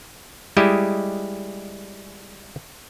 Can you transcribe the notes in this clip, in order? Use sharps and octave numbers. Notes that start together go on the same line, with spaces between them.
G3 G#3 E4 G4 D#5